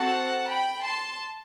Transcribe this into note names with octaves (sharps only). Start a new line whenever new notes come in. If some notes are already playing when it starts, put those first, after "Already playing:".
Already playing: C4 F#4 A4 F#5 A5
G5 B5
A5 C6